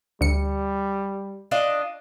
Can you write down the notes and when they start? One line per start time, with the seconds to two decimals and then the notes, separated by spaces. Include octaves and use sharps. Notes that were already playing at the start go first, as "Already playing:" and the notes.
0.21 D2 G3 C#7
1.51 D4 F4 D#5